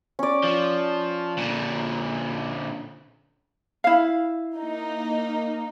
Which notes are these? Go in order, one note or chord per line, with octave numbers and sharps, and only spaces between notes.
C#4 D5
F3
A#2 D3
E4 F5
A#3 D#4